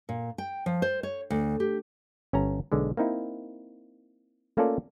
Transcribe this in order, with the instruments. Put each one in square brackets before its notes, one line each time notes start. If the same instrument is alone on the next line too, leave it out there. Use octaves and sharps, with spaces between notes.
[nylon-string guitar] A#2
G5
F3
C5
C#5
D2
G4
[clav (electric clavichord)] G1 C#4 A5 A#5
B1 D3 G#3
A#3 C4 D#4 E4
A3 A#3 C#4 F4 A4 D5